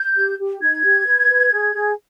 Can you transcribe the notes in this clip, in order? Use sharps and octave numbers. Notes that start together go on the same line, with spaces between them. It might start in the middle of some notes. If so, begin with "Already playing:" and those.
Already playing: G6
G4
G4
D#4 G#6
G4
B4
B4
G#4
G#4